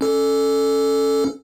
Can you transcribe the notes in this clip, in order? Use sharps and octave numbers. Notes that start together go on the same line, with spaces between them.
C#4 A4